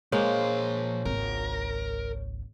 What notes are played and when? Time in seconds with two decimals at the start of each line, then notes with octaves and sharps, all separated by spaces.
0.12 A#2 G#3 A#3 C5 C#5 F5
1.05 G#1 C#2 A#4